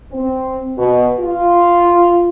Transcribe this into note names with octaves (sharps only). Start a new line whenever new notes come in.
C4
B2
F4